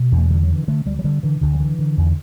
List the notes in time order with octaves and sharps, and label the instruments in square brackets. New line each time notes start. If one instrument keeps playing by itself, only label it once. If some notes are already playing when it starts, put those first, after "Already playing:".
Already playing: [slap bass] B2
E2
A3
D3 G3
F#3
D3
E3
D3 A3
D2 G3
F#3
D3 G3
D3 E3
D2 D3
F#3
D3 E3
D3
E2